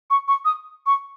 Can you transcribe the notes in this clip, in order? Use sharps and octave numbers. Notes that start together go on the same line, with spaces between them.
C#6
C#6
D#6
C#6